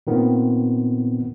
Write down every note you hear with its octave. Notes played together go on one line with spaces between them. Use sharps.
A#2 D#3 B3 C4